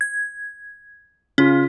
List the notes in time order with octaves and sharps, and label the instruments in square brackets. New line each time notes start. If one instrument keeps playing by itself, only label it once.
[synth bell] G#6
[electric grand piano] C#3 F4 [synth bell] C#4